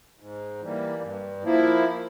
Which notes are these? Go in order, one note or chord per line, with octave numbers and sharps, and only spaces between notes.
G#2
E3 G3 A#3
G2
F3 A#3 E4